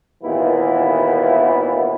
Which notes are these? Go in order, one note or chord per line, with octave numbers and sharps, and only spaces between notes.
G#1 D#2 A#2 E3 B3 E4